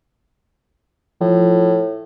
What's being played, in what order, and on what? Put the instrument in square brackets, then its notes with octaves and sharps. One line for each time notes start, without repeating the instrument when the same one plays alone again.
[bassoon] A2 [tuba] F3